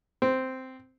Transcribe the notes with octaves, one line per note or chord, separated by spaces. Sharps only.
C4